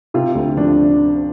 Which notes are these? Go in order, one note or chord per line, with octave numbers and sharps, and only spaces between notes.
C3 F4
D2
F3 D4